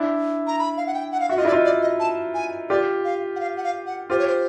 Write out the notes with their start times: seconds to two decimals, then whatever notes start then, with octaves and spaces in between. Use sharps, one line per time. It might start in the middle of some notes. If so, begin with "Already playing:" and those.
Already playing: D4 E4
0.47 A#5
0.59 B5
0.77 F5
0.87 F#5
0.94 G5
1.12 F#5
1.20 F5
1.29 F#4 E5
1.37 F4 D#5
1.45 E4 D5
1.52 D#4 F4
1.65 D5
1.82 D#5
2.00 A5
2.34 G#5
2.69 F4 G4 D5
3.04 F5
3.36 F#5
3.40 F5
3.57 F#5
3.64 F5
3.86 F#5
4.10 F4 G4 C5
4.19 C#5
4.27 C5